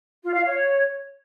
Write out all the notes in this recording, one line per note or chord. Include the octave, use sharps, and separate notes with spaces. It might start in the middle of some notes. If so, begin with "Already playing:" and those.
F4
F5
C#5